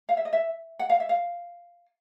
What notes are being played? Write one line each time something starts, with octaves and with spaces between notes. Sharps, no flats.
F5
E5
D#5
E5
F#5
F5
E5
F5